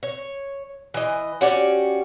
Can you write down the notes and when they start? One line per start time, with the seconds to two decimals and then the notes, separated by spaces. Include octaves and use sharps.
0.03 C#5
0.94 E3 D#5
1.41 C#4 F#4 G4 D5